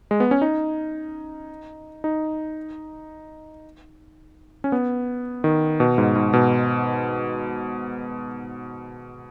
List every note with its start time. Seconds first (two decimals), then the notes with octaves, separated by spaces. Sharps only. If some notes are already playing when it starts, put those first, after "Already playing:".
0.11 G#3
0.20 B3
0.31 C#4
0.42 D#4
2.04 D#4
4.64 C#4
4.72 B3
5.44 D#3
5.80 B2
5.98 G#2
6.15 G#2
6.33 B2